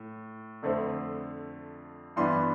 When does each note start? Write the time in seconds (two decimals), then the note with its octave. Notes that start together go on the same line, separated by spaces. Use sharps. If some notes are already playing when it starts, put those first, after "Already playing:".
Already playing: A2
0.62 F2 D3 A3 C4
2.16 G2 E3 B3 D4 C6